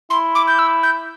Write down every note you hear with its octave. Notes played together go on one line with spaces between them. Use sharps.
E4 C6
D6
G6
E6
G6